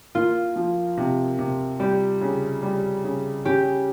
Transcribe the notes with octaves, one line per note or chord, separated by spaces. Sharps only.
A#3 F4
F3
C3
C3
G3 G4
C#3
G3
C#3
C#4 G4